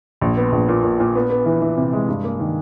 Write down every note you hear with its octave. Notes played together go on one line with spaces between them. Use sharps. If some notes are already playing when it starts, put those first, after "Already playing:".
A#1
B3
A#1
A#2
A#2
A#2
B3
B3
E3
E3
C3
G#3
G2
A#3
D#3